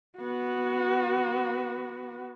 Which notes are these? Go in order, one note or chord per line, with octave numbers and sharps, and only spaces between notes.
B3 F#4